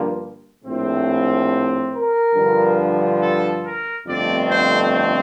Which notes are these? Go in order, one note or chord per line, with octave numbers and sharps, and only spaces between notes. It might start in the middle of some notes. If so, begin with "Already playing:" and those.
Already playing: G2 D3 F3 A#3
A#1 A2 A3 C4
A#4
G2 D3 F3
A4
A#4
G1 F2 D3 A3 C4 D5
C5
C5